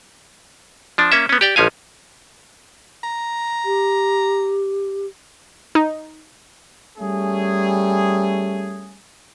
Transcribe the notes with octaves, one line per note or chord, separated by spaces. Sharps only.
F3 D4
A#3 C#4 E5
B3 C#4
G4 D5 G5
A1 F3 C#4 F5 G#5
A#5
G4
D#4
G3 A3 C#4 G#4